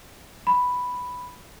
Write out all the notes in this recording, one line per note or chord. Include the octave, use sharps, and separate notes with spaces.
B5